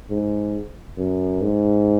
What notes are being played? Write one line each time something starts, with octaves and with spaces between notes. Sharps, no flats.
G#2
F#2
G#2